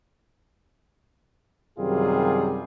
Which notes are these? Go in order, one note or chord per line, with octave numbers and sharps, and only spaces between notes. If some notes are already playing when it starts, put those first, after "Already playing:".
F#2 C3 D#3 G3 F4 G#4